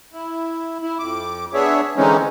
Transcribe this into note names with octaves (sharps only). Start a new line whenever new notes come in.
E4
E4
F2 D6
B3 D4 G#4 C#5 E5
D3 E3 G#3 C4 C#4 D#4